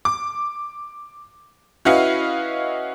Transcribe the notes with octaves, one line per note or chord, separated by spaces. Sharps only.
D6
C#4 E4 F#4 B4 D#5 F5